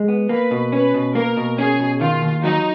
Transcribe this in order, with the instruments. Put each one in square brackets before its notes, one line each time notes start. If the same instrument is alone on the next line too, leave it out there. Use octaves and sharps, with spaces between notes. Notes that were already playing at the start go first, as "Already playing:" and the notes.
Already playing: [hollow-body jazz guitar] G#3
B3
[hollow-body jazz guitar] A#3 [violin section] B4
[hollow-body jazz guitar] B2
[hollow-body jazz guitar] C#4 [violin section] B4
[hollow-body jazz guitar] B2
[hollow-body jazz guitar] A#3 [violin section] A#4
[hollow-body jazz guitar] B2
[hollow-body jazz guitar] C#4 [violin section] G#4
[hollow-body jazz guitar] B2
[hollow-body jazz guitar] D#3 [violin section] F4
[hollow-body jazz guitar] D#2
[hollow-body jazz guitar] F#3 [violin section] D#4